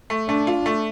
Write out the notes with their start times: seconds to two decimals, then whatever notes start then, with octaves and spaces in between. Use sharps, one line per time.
0.10 A3
0.28 A3 D4
0.47 F4
0.66 A3